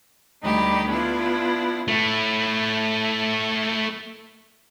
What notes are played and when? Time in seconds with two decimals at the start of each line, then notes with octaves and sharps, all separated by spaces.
0.43 D2 D#3 G3 D#4 G4 B5
0.88 B3 D4 E4 F4
1.88 A3 E4